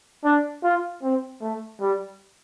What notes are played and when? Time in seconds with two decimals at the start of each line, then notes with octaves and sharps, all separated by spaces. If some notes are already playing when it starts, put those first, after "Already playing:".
0.24 D4
0.63 F4
1.03 C4
1.42 A3
1.81 G3